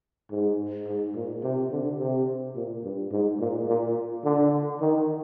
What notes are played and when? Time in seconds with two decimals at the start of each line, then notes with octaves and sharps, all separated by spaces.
0.31 G#2
0.87 G#2
1.16 A#2
1.44 C3
1.72 D3
1.99 C3
2.56 A#2
2.84 G2
3.12 G#2
3.40 A#2
3.68 A#2
4.25 D3
4.81 D#3